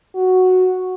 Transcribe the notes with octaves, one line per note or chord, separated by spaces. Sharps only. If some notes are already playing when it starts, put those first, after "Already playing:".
F#4